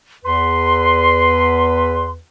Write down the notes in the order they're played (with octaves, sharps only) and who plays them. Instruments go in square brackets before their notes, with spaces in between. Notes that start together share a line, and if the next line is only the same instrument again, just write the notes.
[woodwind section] E2 B4 [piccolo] C6